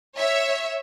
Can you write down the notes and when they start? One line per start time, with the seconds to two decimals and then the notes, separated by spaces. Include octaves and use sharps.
0.17 C#5 E5